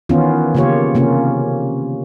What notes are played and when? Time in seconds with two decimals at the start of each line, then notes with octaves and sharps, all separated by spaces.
0.09 D#3 E3 B3 C#4 F4
0.55 C#3 A#3 F4 G4 C#5
0.95 C3 A#3 C#4 F4